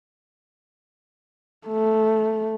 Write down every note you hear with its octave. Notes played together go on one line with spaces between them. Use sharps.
A3